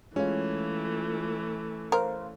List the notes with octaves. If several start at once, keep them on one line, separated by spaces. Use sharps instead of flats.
E3 G#3 A3 C#4 F4
A#4 C5 F5